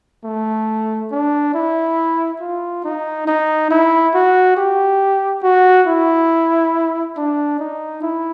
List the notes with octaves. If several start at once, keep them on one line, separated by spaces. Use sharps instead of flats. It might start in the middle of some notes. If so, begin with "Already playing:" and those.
A3
D4
E4
F4
D#4
D#4
E4
F#4
G4
F#4
E4
D4
D#4
E4